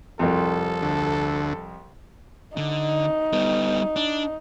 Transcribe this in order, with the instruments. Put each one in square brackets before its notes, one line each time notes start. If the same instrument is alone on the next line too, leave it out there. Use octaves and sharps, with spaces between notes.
[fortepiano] C2 F2 [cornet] A4
[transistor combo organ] D2
[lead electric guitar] D3 [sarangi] D#4
[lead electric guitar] G3 B3
D4